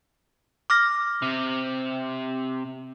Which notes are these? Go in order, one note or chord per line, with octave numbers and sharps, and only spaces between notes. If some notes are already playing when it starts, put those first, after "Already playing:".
D6 F6 A#6
C3